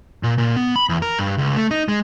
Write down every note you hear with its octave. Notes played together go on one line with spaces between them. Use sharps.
A#2
A#2
B3
B5
E2
A#4
G2
C#2
A3
D#4
G#3